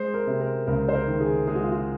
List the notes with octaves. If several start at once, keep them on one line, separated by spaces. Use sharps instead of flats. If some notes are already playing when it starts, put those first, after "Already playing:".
Already playing: G#3 C5
A#4
C3
A#4
C#2 A#4
C5
A#4
D#3
G#4
G#3 G#4
F#4
F4
F#4